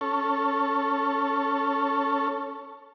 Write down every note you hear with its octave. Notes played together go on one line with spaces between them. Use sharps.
C#4 A4